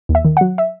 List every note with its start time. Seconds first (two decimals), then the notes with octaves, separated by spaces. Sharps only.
0.09 D#2
0.15 E5
0.25 D#3
0.37 F#3 F#5
0.58 E5